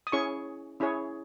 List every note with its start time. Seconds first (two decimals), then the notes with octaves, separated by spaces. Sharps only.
0.07 D#6
0.12 C#4 E4 G#4 C#5 C#6
0.80 C#4 E4 G#4 C#5